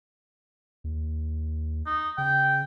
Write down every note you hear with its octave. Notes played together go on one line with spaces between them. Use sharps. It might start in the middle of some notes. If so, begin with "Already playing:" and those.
D#2
D#4
C#3 G5